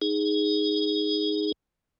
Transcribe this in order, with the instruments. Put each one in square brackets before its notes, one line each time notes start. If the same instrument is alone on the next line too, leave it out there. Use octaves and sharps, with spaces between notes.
[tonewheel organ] D#4 G#4